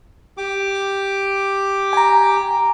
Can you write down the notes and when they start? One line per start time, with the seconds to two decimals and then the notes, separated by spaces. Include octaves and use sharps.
0.38 G4 D6
1.93 G#5 A#5